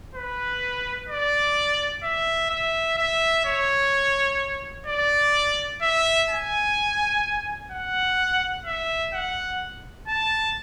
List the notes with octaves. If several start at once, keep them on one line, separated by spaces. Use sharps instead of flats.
B4
D5
E5
E5
E5
C#5
D5
E5
G#5
F#5
E5
F#5
A5